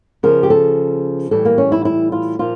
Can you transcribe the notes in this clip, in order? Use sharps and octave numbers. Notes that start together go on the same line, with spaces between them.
C#3 F3 A#4
G4
A4
A2 E3 G3 A4
A#3
C#4
E4
E4
F4
A#2 F3 F4